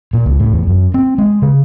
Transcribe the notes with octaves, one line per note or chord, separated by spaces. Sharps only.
A#2
C#2
A2
E2
F#2
C4
G#3
C#3